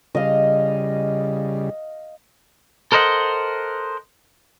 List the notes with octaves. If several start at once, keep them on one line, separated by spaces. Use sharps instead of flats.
C#3 G3 D#5 F5
A4 A#4 C5 D#5 F#5